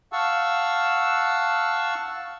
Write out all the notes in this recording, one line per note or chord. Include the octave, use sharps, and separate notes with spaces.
F5 F#5 A5 C#6 E6